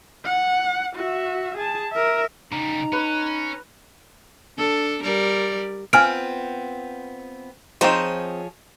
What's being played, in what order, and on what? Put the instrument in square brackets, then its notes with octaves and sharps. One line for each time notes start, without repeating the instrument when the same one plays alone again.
[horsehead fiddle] F#5
F#4 E5
G#4 A5
A#4 E5
[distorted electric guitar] C#3 G3 [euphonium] D#4 [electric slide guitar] A#5
[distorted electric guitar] C#4 [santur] B4
[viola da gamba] D4 A4
G3 A#4 D5
[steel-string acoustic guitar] B3 C4 F4 [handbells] G#5 F6 D7
[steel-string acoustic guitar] F3 G#4 C#5 [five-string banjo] C4 D#4 C5